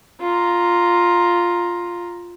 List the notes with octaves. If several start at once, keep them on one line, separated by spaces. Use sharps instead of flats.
F4 A#5